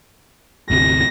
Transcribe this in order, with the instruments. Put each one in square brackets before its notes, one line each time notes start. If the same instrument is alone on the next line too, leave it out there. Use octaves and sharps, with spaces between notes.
[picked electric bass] G1 D2 C3 [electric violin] A#6